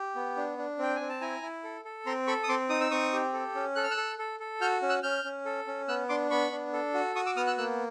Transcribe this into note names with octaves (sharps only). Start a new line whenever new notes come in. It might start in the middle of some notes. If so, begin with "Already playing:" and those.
Already playing: G4
B3
D4
D4
C4 G5
G#5
C4
A5
E4 G#5 A#5
E4
A4
A4
C4 A#5 C6
A4 B5 C#6
D#6
C4 C6 D6
D#4 D#6
E6
C4 C#6 D#6
G4
A4
C#4
A4 F#6
F6
E6 F#6
A4
A4
A4
F#4 F6 G6
C#4
E6 F#6
C#4 F6 G6
C#4
A4
C#4
B3 E6 F#6
D4 C6 D6
B3 B5 C#6
D4
A4
F#4
F#4 C#6 D#6
D6 E6
B3 D#6 F6
E6 F#6
A#3 E6 F#6